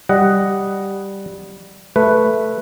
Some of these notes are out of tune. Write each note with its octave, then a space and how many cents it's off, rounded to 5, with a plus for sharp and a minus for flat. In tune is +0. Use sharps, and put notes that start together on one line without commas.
G3 +0 D#5 +0 F#5 +5
A3 +0 B4 +0